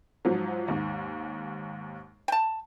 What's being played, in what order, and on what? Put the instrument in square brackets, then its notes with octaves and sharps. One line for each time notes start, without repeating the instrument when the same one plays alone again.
[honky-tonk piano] G#2 F3 F#3
D#2 G#2
[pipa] G5 A5